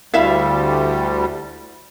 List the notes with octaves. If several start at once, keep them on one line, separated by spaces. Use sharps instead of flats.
D2 G3 E4 E5 F5